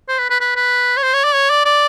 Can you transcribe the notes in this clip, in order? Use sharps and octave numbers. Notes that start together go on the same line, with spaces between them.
C5
B4
B4
B4
B4
C#5
C5
C#5
D5
C#5
D5
D5